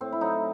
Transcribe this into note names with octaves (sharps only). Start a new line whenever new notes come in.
A2 C4
E4
F#3 D#4